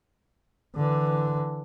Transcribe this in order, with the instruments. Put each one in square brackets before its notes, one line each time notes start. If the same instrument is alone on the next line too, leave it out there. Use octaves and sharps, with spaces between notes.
[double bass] D3 E3